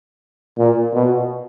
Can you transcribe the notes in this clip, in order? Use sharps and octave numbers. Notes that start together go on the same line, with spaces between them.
A#2
B2